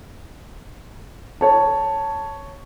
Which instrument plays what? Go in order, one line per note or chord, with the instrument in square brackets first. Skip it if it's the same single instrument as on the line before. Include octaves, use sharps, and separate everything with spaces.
[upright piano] C#5 A5